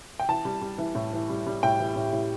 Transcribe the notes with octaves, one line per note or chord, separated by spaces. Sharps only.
G5
E3 A5
G3
G3
E3
A2
E3
G3
G3
A2 G5
E3
A2
A2